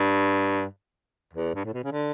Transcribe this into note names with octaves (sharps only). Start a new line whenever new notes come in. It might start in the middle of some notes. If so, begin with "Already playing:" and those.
Already playing: G2
E2
G2
A2
B2
C#3
D3